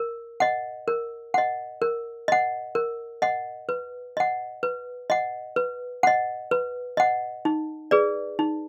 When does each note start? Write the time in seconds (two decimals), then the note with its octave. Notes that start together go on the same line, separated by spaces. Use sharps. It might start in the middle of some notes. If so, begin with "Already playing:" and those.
Already playing: A#4
0.40 D#5 F#5
0.88 A#4
1.34 D#5 F#5
1.82 A#4
2.28 D#5 F#5
2.75 A#4
3.22 D#5 F#5
3.69 B4
4.17 D#5 F#5
4.63 B4
5.10 D#5 F#5
5.56 B4
6.03 D#5 F#5
6.51 B4
6.97 D#5 F#5
7.45 D#4
7.91 G#4 B4 D5
8.39 D#4